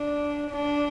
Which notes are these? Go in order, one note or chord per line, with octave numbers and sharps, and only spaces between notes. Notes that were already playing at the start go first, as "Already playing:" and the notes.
Already playing: D4
D4